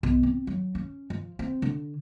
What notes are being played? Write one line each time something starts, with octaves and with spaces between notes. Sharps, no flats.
B1
C4
F#3
C#4
F3
C4
D3